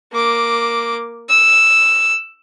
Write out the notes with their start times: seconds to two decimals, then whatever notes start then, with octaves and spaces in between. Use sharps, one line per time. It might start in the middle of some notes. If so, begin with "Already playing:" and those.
0.13 A#3 D6
1.30 E6